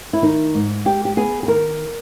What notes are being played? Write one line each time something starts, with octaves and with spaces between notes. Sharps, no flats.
E4
D#3 D#4
G#2
G#3 G4
G4
B3 G#4
G#4
D#3 A#4